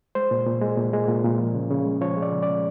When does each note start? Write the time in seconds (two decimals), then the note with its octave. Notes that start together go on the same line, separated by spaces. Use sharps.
0.15 G#3 C5
0.31 A#2
0.47 A#2
0.62 G#3
0.77 A#2
0.93 G#3
1.08 A#2
1.24 A#2
1.40 F3
1.55 C#3
1.71 C#3
1.85 G#3
2.01 F3 C#5
2.17 G#3
2.22 D5
2.32 C#3
2.43 C#3 D5